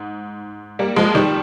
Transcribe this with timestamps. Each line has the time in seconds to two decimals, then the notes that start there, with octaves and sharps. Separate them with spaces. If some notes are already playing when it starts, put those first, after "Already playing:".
Already playing: G#2
0.79 G3 A#3
0.96 F3 G#3
1.15 D#3 G3